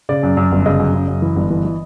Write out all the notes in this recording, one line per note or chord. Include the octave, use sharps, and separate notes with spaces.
C#3 D5
F#2
F#2
G1
C#3 D#5
F#2
C#3
F#2
E3
G1
E3
E3